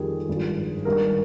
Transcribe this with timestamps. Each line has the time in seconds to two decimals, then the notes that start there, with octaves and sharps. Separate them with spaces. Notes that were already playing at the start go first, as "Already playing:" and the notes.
Already playing: F2 D#3 G3 G#4
0.28 G#1 G2 F3
0.85 G#1 G2 D#3 G3 A#4